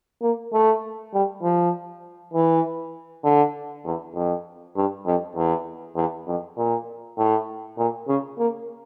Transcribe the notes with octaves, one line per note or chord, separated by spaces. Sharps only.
A#3
A3
G3
F3
E3
D3
E2
F2
G2
F2
E2
E2
F2
A#2
A2
A#2
C#3
A#3